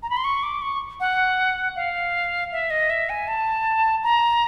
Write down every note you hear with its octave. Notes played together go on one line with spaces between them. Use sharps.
A#5
B5
C6
C#6
D6
C#6
F#5
F5
E5
D#5
E5
G#5
A5
A#5